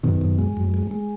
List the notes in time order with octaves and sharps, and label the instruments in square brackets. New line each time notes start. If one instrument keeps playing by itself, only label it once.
[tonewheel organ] F#2 [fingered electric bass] B2 D#3
[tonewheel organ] F#2
G#3
F#2
G#3
G#3